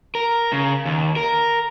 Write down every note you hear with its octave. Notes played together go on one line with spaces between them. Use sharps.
A#4
C#3
D#2
A#4